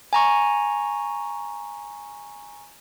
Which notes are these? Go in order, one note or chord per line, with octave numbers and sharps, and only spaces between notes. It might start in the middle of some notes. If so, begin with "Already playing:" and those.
G#5 A#5 C#6